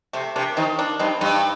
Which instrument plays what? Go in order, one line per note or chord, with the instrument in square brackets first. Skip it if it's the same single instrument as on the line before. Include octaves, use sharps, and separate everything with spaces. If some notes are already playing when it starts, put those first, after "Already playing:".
[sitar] C3 [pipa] A3 C4
[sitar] C3 [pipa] A#3 D4
[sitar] D#3 [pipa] C4 D#4
[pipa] A#3 D4
[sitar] G2 [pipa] C4 D#4
[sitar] G2 [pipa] C4 D#4